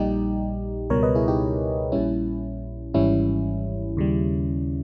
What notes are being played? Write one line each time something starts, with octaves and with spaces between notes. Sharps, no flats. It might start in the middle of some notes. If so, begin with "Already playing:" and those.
Already playing: A#1 A#2 G3 D#4 G4
C#2 B2 G3 A#4 C#5
B4 D#5
E4 G#4
D#4 G4
A#1 A#2 G3 C#4 E4
G#1 G#2 E3 G3 C#4 E4
D#2 C#3 G3